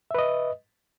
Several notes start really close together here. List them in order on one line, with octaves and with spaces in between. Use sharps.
E5 B4 D#5